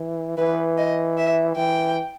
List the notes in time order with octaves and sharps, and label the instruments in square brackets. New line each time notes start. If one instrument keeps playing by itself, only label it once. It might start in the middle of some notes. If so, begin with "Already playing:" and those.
Already playing: [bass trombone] E3
[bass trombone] E3 [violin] B4
[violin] D#5
E5
[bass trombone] E3 [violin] G5